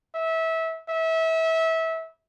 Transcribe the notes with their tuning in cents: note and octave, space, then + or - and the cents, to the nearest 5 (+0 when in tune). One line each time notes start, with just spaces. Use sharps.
E5 -20
E5 -25